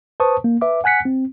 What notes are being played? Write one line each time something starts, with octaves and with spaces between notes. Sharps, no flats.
B4 C5 A5 C#6 D#6
A#3
B4 E5 D6
F#5 G#5 F#6 B6 C#7
C4